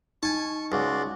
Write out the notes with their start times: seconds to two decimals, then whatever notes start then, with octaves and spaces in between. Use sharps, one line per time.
0.23 D#4 G#5 A5 C#6
0.72 C#2 F#4 D5 C6